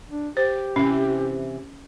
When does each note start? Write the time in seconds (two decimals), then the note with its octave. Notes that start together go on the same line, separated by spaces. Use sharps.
0.11 D4
0.37 G4 C5
0.76 C3 E3 C#4